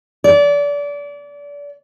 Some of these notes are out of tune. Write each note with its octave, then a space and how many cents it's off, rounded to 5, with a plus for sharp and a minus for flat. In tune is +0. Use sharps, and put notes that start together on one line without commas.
D5 -30